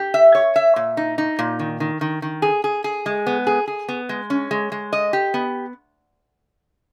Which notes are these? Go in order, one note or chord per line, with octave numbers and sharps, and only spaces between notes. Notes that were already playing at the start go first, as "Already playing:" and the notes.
Already playing: G4
E5
C#5
E5
A#2
D#4
D#4
A#2
D#3
D#3
D#3
D#3
G#4
G#4
G#4
G#3
B3
G#4
G#4
B3
G#3
C#4
G#3
G#3
D#5
G4
B3